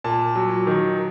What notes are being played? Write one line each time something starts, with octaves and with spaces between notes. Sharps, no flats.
A#2 A5
F#3
D#3